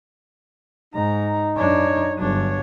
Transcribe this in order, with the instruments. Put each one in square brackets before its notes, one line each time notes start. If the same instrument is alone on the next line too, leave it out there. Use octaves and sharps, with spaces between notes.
[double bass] G#2 [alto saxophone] D#4 [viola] A#5
[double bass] F#2 D4 [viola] C#5
[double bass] G1 F#3 [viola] D4 C#5